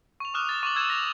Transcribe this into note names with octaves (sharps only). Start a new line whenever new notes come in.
C#6 F7
D6 D#6 F6 F#6 F7
A6
C#6 D6 F#7
D6 E6 G#6 E7 F7
A#6 F7